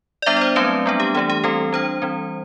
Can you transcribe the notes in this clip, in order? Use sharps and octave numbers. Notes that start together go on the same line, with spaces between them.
D5
G3 B3 D4 E5
D5
C5
F#3 A3 C4 B4
G3 B3 D4
G4
E3 A3 D4 G4
G4
E3 G3 C4 A4
G3 D4 C5
E3 G3 C4